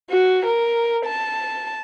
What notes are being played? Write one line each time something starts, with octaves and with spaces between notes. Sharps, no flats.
F#4
A#4
A5